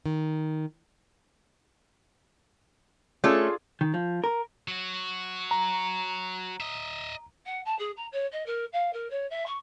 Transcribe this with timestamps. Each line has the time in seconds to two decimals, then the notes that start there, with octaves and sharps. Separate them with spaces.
0.06 D#3
3.24 A3 C#4 D4 F4 G#4 A4 A5
3.81 D#3
3.94 F3
4.24 A#4
4.68 F#3 F#4
5.51 A#5
6.60 D#5 E5
7.45 F#5
7.65 A5
7.78 G#4
7.96 A#5
8.12 C#5
8.31 D#5
8.46 A#4
8.72 F5
8.93 A#4
9.10 C#5
9.30 E5
9.46 C#6